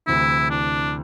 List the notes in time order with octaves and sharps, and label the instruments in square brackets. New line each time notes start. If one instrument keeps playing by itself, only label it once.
[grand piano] D2 C3 E3 [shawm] E4
[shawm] D4